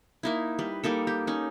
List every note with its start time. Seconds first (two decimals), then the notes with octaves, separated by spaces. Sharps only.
0.23 A#3 D#4 E4
0.59 G3 B4
0.83 G3 A#3 D#4 A4
1.07 G4
1.27 C#4 D#4